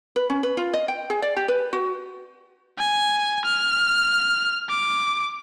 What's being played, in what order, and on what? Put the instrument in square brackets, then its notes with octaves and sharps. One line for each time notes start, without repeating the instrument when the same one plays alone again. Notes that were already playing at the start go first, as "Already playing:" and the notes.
[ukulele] B4
C#4
B4
F4
D#5
G5
G#4
D5
G4
B4
F#4
[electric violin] G#5
F6
D6